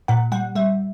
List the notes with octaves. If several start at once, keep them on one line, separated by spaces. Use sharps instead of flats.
A#2 F#5
G3 F#5
G3 E5